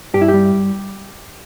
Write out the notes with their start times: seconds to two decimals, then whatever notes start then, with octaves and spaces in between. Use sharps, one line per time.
0.14 G2 G4
0.21 E4
0.28 G4
0.34 G3